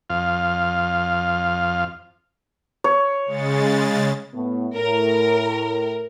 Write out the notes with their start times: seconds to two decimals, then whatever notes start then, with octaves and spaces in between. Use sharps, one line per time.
0.10 F2 F5
2.84 C#5
3.26 C#3 G#3 A6
4.34 A2 B3
4.75 A2 A#4